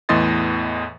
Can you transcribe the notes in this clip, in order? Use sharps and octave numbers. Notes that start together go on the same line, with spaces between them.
E2 A2 E3 D#5 C6 A6